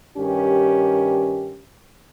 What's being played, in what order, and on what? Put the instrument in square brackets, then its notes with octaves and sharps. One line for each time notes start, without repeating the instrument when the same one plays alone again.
[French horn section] G2 D#3 C#4 G4